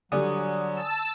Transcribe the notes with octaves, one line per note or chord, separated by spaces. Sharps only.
D3 F#3 G3 D5 G#5 D#6
A5 E6